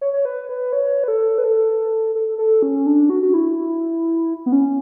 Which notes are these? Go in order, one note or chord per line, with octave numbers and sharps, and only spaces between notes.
C#5
C#5
B4
B4
C#5
B4
A4
B4
A4
A4
A4
C#4
D4
F#4
F#4
E4
B3
C#4